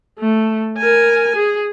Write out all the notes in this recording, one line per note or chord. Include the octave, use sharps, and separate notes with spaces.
A3
A#4 G#5
G#4